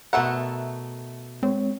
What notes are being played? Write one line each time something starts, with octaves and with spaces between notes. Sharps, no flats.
B2 A3 A4 A#4 E5 F#5
G#3 C4 C#5